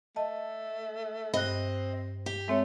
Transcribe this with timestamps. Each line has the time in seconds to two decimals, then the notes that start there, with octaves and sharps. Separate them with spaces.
0.16 A3 D#5 A5
1.34 G2 C4 D#5 F#6
2.26 G4
2.48 G#3 A3 C4 C#5